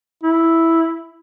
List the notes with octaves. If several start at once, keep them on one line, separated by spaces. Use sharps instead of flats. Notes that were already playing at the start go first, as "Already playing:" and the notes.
E4